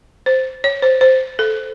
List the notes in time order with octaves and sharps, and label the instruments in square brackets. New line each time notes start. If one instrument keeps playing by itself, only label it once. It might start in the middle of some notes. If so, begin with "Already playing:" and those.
[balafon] C5
C#5
C5
C5
A4